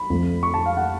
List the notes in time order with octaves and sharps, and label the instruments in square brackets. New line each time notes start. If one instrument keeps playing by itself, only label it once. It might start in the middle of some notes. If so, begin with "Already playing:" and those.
Already playing: [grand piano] B5
F2 F3 A3
C#6
A5
F5
F#5